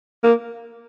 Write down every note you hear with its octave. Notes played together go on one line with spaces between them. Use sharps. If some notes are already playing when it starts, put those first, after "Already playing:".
A#3